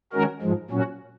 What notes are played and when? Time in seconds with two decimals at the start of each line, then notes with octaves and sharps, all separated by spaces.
0.13 D#3 G#3 C#4 F#4 A#4
0.42 G#2 F3 G#3
0.70 A#2 F#3 C#4 F#4